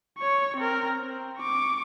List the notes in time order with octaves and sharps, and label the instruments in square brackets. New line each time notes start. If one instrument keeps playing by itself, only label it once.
[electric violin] C#5 C#6
C4 A#4
C4
C#6 D6